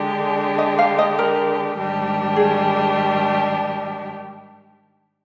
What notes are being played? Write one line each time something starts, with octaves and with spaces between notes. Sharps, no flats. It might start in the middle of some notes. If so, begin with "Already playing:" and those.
Already playing: D3 G#3 D4 G4
D#5
F5
D#5
A#4
G#2 D#3 G3 D4 G4
G#4